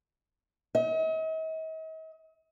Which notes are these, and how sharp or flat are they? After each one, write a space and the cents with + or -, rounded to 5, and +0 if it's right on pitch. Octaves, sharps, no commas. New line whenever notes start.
D#5 +45